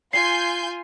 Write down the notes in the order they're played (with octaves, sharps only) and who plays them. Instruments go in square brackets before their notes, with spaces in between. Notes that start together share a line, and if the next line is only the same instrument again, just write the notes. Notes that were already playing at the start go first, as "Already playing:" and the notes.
[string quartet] F4 [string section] G#5 C6 G6 [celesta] C7